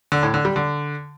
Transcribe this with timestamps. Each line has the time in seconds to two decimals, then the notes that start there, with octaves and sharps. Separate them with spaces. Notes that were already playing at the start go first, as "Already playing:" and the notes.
0.12 D3
0.23 A2
0.34 D3
0.45 G3
0.56 D3